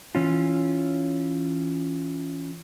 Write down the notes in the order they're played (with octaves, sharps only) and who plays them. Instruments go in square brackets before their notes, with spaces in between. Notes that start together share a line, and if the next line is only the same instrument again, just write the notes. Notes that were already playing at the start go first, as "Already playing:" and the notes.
[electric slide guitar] E3 C#4 F4